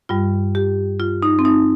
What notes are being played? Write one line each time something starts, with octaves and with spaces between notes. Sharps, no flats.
G2 G3 F4
G4
F4
D#4
C4
D#4